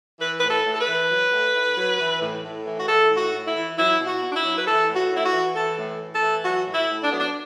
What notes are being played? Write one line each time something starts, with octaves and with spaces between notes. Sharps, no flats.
E3 B4
B4
A2
A4
A2
A4
B4
E3
F#3
A2
A2
F#3
E3
A2
A2
E3
F#4
E3 A4
A2
F#4
A2
E4
E3
F#3 E4
B2
F#4
B2
D4
E4
F#3
B4
E3 A4
A2
F#4
A2
E4
F#4
E3
E3 A4
A2
A2
A4
E3
F#3 F#4
A2
E4
A2
D4
F#3 B3
D4